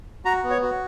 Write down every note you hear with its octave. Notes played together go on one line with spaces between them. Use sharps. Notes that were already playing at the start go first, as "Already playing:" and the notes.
F#4 A#5
B3
C#5
F#4